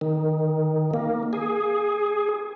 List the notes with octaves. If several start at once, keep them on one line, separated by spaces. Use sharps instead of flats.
D#3
A#3
G#4